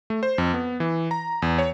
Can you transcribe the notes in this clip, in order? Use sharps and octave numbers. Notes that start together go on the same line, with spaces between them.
A3
C5
F2
B3
E3
A#5
E2
C#5